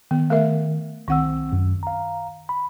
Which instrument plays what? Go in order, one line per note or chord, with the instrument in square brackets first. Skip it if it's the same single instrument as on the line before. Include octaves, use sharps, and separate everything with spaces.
[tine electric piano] D#3 [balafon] B3
[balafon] A3 A#4 E5
[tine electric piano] B1 C4 E6 [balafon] D#3 F#5
[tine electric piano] F#2
F5 A#5
B5